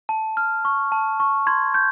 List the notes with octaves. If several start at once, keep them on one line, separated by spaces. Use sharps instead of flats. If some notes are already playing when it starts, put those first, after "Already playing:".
A5
F6
C#6
A5
C#6
C6 G#6
G6